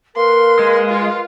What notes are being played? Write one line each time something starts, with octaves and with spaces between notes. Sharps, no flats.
A#3 A#4 B4 F5 C6
G#3
F4